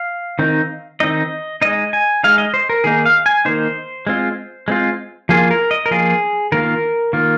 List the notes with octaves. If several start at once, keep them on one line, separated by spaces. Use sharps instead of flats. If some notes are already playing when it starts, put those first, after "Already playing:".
Already playing: F5
D#3 C4 D#4
D#3 C4 D#4 D#5
G#3 D#4 D#5
G#5
G#3 D#4 F5
D#5
C5
A#4
D#3 A#3 D#4 G#4
F5
G#5
D#3 A#3 D#4 C5
G#3 C4 F4
G#3 C4 F4
F3 A#3 F4 G#4
A#4
D#5
A#4
F3 A#3 F4 G#4
D#3 A#3 F4 A#4
D#3 A#3 F4